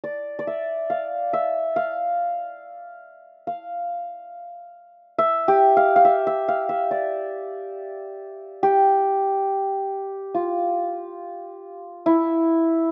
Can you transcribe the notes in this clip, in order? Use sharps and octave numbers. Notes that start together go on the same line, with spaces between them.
D5
D5
E5
F5
E5
F5
F5
E5
G4
F5
F5
E5
E5
F5
E5
D5
G4
F4
E4